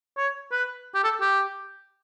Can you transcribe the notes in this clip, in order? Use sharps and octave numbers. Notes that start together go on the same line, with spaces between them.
C#5
B4
G4
A4
G4